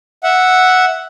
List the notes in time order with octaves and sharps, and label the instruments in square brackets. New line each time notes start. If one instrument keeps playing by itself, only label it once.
[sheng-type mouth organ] E5 F#5